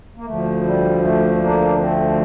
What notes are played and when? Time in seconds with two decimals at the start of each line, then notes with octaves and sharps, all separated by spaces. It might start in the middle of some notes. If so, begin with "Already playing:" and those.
0.17 A#3
0.26 D2 D3 F3 A3
0.65 G3
1.04 A3
1.42 A#3 D4
1.80 A3 C4